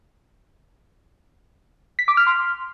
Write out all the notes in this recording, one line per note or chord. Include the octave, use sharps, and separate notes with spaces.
B6
D6
F6
C6